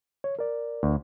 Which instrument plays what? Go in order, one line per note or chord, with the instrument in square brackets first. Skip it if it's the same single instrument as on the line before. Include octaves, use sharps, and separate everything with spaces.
[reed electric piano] C#5
A#4 D5
[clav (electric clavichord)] D2